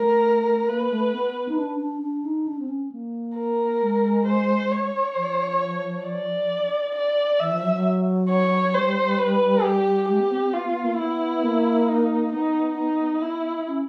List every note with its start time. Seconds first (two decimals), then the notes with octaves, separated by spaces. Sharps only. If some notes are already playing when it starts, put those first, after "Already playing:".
Already playing: A3 A#4
0.69 A#3 B4
0.91 A3
1.13 B3
1.49 D#4
1.58 D4
1.80 D4
2.02 D4
2.25 D#4
2.47 D4
2.59 C4
2.69 C#4
2.92 A#3
3.37 A#4
3.82 G#3
4.27 C5
4.71 C#5
5.16 F3
6.06 D5
6.95 D5
7.40 E3 E5
7.51 F3
7.63 F#3
7.73 F#3
8.29 C#5
8.75 G3 C5
9.19 B4
9.63 G4
10.09 G#3 G4
10.20 B3
10.31 C4
10.42 C4
10.53 B3 F4
10.69 B3
10.84 A#3
10.98 B3 E4
11.43 A#3
11.88 D#4
12.32 B3 D#4
12.78 D#4
13.22 E4
13.67 C#4